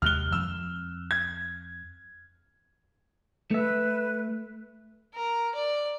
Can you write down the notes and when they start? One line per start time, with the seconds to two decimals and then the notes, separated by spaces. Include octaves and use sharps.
0.02 D#2 C3 G#3 F6 F#6 G7
0.32 F2 E6
1.11 G#6
3.51 A3 B4 E5
5.14 A#4
5.55 D5